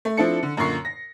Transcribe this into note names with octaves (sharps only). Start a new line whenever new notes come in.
A3
F3 C4 D4 E4 A4 C#7
D3
F#2 A#2 D3 C#6 C7
A#6